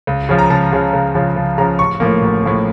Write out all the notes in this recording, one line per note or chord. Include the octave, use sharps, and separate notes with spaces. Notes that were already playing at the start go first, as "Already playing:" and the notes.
C#2
C#3 F3
A#5
C#2 A5
C#3 F3
C#2
C#3 F3
C#2
C#3 F3 A#5
A1 C#6
A2 F3 A#3
A1
A2 F3 A#3